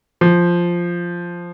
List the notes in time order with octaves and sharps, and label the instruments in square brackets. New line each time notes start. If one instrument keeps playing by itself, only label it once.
[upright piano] F3